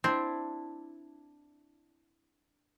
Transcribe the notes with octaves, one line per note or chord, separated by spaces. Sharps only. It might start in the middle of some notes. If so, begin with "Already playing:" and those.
C4 D4 E4